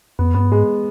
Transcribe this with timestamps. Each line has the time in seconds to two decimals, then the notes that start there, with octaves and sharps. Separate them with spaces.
0.19 F2 B3
0.34 G2 B3
0.51 G#2 G#3